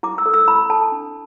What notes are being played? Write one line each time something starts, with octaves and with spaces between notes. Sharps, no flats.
E4 D6
E6
A4
E6
E4 B5
A4 A5
D4